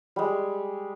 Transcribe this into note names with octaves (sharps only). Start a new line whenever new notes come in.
G3 G#3